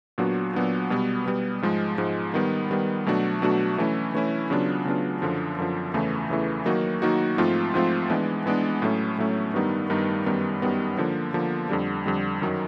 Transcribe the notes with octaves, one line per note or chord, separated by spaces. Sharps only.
A#2 F#3 B3 D4 F#4
A#2 F#3 B3 D4 F#4
B2 G3 B3
B2 G3 B3
G#2 F3 G#3
G#2 F3 G#3
D#3 G3 B3
D#3 G3 B3
B2 F#3 A3 D4 F#4
B2 F#3 A3 D4 F#4
E3 A3 C#4 E4
E3 A3 C#4 E4
C#3 F#3 B3 D4 F4
C#3 F#3 B3 D4 F4
F#2 D3 F3
F#2 D3 F3
E2 C#3 E3 A3
E2 C#3 E3 A3
D#3 F#3 A#3 D#4 F#4
D#3 F#3 A#3 D#4 F#4
G#2 F3 A3 C4 F4
G#2 F3 A3 C4 F4
E3 G#3 B3 D4
E3 G#3 B3 D4
A2 F#3 A3 C#4
A2 F#3 A3 C#4
G2 D#3 G3 B3 D#4
G2 D#3 G3 B3 D#4
F#2 D#3 G3 B3
F#2 D#3 G3 B3
D3 F3 A#3
D3 F3 A#3
F2 D3 G3
F2 D3 G3
F#2 D#3 F#3